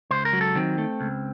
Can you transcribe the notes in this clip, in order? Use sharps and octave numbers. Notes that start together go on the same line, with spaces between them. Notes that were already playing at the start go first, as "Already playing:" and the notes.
C#2 C5
A#4
F#3
A4
D#3 C4
A3
C#2